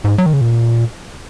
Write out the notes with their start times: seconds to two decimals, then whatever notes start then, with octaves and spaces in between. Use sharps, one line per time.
0.04 G#2
0.18 F#3
0.26 D#3
0.33 C#3
0.41 A#2